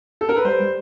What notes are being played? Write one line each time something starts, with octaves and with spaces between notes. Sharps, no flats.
A4
A#4
B4
G3 C5
G3